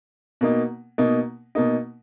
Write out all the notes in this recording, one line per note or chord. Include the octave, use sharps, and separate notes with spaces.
B2 A#3 D#4
B2 A#3 D#4
B2 A#3 D#4